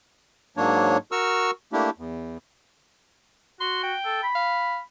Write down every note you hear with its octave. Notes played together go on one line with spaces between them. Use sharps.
G#2 F#3 A#3 D4 C#5
F#4 A#4 C#6 E6 F6
A3 A#3 D4 E4 G4
E2
F#4 C6
G5
A4
B5
F5